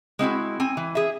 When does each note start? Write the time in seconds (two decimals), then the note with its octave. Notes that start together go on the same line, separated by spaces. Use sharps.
0.19 G#3 C4 E4 F#4
0.60 C4 G#5
0.77 E3
0.95 G#4 E5